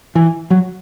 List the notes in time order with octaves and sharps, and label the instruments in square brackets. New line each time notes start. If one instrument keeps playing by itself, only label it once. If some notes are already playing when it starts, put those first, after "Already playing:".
[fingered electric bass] E3
F#3